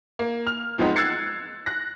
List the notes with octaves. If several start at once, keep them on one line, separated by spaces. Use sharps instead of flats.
A#3
F6
E2 F3 G#3 B3 C4 D#4
E6 F#6 G#6 A6 C7 C#7
F#6 A#6